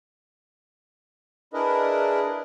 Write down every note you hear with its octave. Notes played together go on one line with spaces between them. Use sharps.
D4 E4 G#4 A#4 B4 D#5